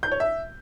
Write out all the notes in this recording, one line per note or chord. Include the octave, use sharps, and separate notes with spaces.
G6
C#5
E5